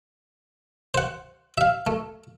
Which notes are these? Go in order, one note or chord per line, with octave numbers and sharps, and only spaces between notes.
C5 F#5
E5 F5
A3